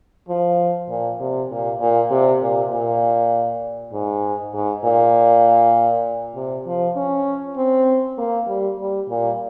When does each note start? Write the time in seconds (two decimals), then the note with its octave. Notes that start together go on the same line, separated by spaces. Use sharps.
0.28 F3
0.89 A#2
1.20 C3
1.51 A#2
1.80 A#2
2.10 C3
2.42 A#2
2.71 A#2
3.92 G#2
4.53 G#2
4.84 A#2
6.35 C3
6.66 F3
6.96 C#4
7.56 C4
8.18 A#3
8.47 G3
8.78 G3
9.09 A#2